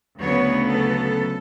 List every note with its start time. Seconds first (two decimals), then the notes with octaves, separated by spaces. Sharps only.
0.19 D2 C#3 F#3 B3 C#5
0.70 A4